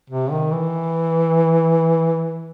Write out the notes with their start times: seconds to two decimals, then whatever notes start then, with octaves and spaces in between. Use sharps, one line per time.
0.10 C3
0.31 D#3
0.52 E3